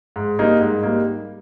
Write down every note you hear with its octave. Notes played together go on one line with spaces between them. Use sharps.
G#2
G3 A#3 D#4
G#2
G3 A#3 D#4